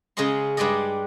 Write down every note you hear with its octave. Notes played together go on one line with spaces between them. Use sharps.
C#3 G#3 C#4 D#5 C6
G2 G#3 G4 D5 D#5